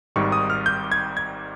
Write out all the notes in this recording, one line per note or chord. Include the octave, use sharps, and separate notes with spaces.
G#1 G#2 D#3 G3 C#6
D#6
F6
G6
G#6
G#6